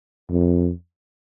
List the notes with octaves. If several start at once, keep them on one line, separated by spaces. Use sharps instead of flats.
F2